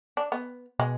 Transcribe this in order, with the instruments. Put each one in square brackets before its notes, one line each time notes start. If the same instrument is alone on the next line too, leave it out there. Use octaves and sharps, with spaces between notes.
[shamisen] D4
B3
[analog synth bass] B2 [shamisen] G#3